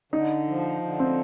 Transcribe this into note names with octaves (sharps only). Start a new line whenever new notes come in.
D3 D#4
F3
D3
C4